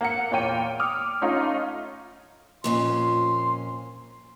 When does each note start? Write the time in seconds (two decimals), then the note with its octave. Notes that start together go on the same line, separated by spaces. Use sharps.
0.01 A#3 F#5 C#7
0.31 E2 A#2 C#5 G5 D#7
0.80 D6 D#6 F6
1.22 A3 C#4 D#4 F4
2.64 F2 A#2 C#4 C6